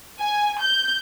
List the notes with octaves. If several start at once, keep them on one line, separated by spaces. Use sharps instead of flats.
G#5
G6